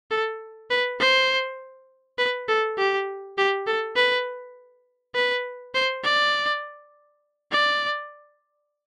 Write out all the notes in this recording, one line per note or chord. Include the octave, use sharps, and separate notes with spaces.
A4
B4
C5
B4
A4
G4
G4
A4
B4
B4
C5
D5
D5